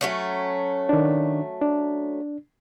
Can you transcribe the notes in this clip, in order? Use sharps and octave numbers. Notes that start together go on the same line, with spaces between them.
F#3 A3 C#4
D#3 D4
D4